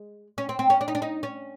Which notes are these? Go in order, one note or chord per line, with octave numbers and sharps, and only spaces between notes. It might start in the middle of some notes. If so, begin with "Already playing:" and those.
Already playing: G#3
C#4
C4
C4
C#4
D4
D#4
D4
D#4
C#4